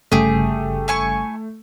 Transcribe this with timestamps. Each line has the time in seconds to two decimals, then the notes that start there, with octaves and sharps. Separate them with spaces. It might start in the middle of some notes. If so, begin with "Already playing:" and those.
0.12 G1 C#3 G3 A3 G4 G#4
0.88 E4 G#5 C#6